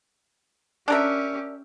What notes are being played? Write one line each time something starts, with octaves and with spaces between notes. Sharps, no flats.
C#4 D4 G4 A#4 E5